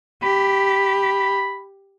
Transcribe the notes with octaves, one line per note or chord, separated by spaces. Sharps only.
G4 B5